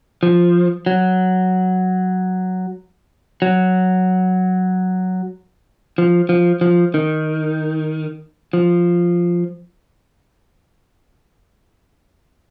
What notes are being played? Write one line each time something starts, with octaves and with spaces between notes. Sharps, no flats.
F3
F#3
F#3
F3
F3
F3
D#3
F3